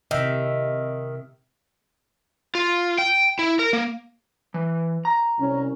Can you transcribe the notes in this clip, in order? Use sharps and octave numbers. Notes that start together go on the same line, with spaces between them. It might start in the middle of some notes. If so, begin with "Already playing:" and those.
C3 D#3 E5
F4
G5
E4
A#4
A#3
E3
A#5
C2 C#4